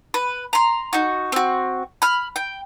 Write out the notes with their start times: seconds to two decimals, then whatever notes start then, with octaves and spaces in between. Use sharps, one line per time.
0.14 B4
0.53 A#5 C6
0.93 D#4 F#4
1.32 C4 F#4
2.02 B5 F6
2.36 G5